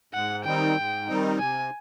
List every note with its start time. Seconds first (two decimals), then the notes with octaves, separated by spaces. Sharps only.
0.13 G#2 F#5
0.44 D#3 G3 C4 D#4 G5
0.76 G#2
1.07 D#3 G3 C4 D#4
1.39 C3 G#5